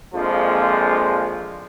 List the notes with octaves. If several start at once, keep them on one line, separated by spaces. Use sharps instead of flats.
A#1 F2 F3 G#3 F4